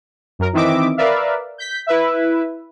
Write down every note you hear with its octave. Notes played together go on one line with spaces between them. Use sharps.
F#2 A#4
D#3 E3 C4 D#5 E5 D6
A#4 B4 D5 E5 F5
G6 B6
E4 B4 E5